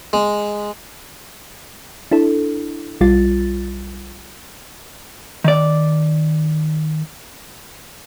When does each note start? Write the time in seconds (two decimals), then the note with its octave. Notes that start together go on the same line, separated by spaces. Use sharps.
0.13 G#3
2.11 D4 E4 A4
3.01 B1 G3 F4 A6
5.44 D#3 D5